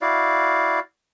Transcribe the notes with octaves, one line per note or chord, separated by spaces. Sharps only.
E4 F#4 D5 F5